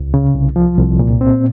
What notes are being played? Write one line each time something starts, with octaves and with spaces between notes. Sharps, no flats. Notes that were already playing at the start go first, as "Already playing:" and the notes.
Already playing: C#2
C#3
C2
F3
C2
A#2
C4